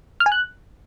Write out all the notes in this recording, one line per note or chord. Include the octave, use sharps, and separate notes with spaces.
F6
G#5
F#6